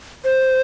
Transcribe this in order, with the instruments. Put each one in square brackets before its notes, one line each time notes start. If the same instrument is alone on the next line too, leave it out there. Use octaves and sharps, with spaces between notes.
[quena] C5